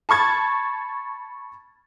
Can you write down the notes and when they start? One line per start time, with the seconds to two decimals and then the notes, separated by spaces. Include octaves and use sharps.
0.09 A5 B5 C#6 G#6 A6